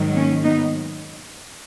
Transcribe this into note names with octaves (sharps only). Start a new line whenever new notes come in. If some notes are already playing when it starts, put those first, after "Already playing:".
Already playing: G#2 D#3 F#3
A#3 C#4
B3 D#4